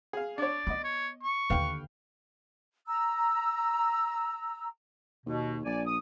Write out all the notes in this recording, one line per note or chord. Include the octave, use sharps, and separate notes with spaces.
G#4 F5
D4 C#5 D5
B3 D#5 D6
C#5
C#6
D#2 D3 B4 F5 G5
A#5 E6
D#2 B2
A#1 D5 G#5
D#6